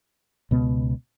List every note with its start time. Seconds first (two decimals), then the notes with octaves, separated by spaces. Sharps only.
0.51 C#2 B2 B3